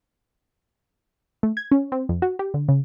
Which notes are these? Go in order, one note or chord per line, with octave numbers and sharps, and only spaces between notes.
A3
G#6
C#4
C4
F2
F#4
G4
D3
C#3